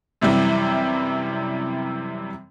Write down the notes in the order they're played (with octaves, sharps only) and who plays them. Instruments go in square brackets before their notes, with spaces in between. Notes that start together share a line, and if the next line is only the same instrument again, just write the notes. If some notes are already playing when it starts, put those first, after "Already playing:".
[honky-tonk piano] F#2 C3 E3 G3